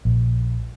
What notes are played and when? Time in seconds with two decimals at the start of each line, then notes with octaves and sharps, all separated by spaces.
0.05 A#1